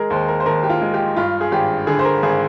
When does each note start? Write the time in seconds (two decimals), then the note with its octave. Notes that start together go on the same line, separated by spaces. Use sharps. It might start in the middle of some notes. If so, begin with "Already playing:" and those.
Already playing: G#3 G#4 A#4
0.10 D#2 C5
0.28 A#4
0.40 C5
0.46 D#2 A#4
0.63 G4
0.70 F4
0.81 G#3
0.94 G4
1.16 G2 F4
1.41 G#4
1.52 G#1 G4
1.87 D3 G#4
1.99 C5
2.05 A#4
2.23 G#1 G#4